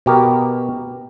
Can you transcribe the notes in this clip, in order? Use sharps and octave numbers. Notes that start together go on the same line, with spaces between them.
B2 G4 A#4